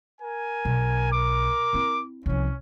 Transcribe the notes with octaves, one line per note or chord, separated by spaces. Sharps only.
A#4 G#5
B1
A#4 D6
C4 E4
C2 F3 C#4